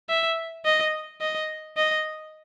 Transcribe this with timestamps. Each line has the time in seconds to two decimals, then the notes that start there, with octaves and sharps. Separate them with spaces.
0.09 E5
0.65 D#5
1.21 D#5
1.77 D#5